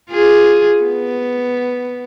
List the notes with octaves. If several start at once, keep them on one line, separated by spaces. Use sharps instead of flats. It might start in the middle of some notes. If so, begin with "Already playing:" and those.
F4 G#4
B3